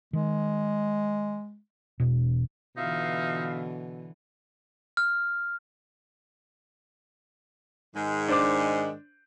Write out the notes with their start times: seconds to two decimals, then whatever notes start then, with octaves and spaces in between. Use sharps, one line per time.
0.13 D#3 G#3
2.00 E1 B2
2.77 B2 D3 E3 D#4 F4 E5 F5
4.97 F6
7.94 G#2 D#3 G#3
8.28 D4 C5 D6